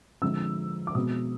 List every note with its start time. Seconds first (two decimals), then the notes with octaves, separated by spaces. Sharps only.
0.22 D3 F3 G#3 C4 E6
0.87 D6
0.95 B2 G#3 C4 D#6